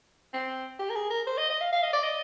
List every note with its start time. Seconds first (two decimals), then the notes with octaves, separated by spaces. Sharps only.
0.33 C4
0.80 G4
0.90 A#4
0.95 G#4
1.10 A#4
1.27 C5
1.38 D#5
1.50 D#5
1.61 F5
1.73 F5
1.83 D#5
1.93 D5
2.03 D#5